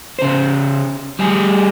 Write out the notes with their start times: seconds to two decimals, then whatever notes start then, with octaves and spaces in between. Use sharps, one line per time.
0.19 C#3 C5
1.19 G3 G#4